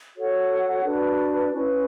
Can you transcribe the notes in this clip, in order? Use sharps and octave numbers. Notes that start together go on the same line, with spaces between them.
F#4 A4 C#5 F#5
D4 F#4 B4
C#4 E4 B4